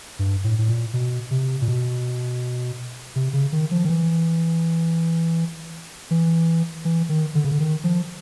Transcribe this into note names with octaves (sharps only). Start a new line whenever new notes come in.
G2
A2
A2
A#2
B2
C3
A#2
B2
C3
C#3
D#3
F3
D#3
E3
E3
E3
D#3
D3
C#3
D3
D#3
F3